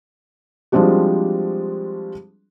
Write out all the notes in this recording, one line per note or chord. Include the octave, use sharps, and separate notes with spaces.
F3 G3 G#3 C4 D4 F#4